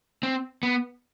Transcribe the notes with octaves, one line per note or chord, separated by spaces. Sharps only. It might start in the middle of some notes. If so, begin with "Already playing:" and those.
C4
B3